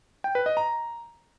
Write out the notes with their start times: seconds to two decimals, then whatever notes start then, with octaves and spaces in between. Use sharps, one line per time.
0.24 G5
0.35 B4
0.46 D#5
0.57 A#5